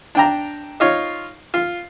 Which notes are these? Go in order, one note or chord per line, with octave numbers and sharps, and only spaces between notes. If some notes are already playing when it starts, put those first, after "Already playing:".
D4 G5 A#5
D#4 F4 C#5
F4